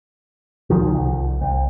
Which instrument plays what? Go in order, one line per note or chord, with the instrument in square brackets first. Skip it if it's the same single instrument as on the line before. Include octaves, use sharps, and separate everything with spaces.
[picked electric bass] C#2 D#3 F3
C2
C2